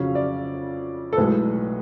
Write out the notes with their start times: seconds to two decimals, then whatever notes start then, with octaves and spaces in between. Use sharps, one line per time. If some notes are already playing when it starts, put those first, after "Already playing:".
Already playing: F2 C#3 F#3 C#4 F5
0.15 D5
1.13 A4
1.17 B1 A2 G#3 B4